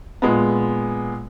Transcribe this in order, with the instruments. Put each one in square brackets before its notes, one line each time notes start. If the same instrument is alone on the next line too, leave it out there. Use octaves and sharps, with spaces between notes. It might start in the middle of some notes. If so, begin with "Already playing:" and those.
[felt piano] A#2 G#3 B3